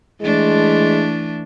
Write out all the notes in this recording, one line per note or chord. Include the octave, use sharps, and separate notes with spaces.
E3 G#3 A3 D4